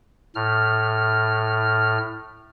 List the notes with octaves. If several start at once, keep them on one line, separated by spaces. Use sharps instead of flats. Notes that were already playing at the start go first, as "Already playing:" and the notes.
A2 F6